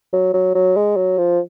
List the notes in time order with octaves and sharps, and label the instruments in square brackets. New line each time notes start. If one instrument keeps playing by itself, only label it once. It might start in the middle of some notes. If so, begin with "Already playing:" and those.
[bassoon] F#3
F#3
F#3
G#3
F#3
F3